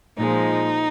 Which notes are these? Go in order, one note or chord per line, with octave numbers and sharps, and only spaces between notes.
A#2 F3 G#3 D#4